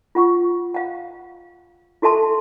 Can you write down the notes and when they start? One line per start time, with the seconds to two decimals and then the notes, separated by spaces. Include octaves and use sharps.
0.15 F4 F#5 C#6
0.74 F5 F#5
2.02 E4 F#4 A4 E5 A5 C6